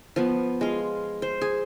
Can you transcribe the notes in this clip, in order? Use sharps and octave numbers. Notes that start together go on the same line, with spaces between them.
F3 B3
G#3 F4
C5
G#4